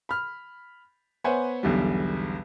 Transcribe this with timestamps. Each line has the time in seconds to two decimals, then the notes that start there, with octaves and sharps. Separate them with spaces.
0.09 B5 F6
1.24 B3 C5 C#5 E5 F#5 G#5
1.63 B1 E2 D3 G3